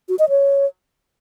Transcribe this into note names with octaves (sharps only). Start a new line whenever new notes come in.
F#4
D#5
C#5